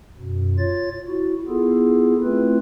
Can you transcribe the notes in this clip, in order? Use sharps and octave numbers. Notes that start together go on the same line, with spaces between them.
F#2 B2
F4 C#5 A6
E4 F#4
B3 E4 F4 G#4 A4
A3 C4 E4 F4 B4